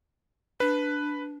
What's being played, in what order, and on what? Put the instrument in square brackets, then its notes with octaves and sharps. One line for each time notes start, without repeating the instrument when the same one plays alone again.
[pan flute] D4 [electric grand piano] B4